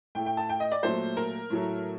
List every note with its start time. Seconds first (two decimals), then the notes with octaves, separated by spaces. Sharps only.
0.15 A2 A3 G5
0.26 G5
0.37 A5
0.49 G5
0.60 D#5
0.72 D5
0.83 A#2 F#3 A3 C5
1.17 A#4
1.50 A2 F#3 A3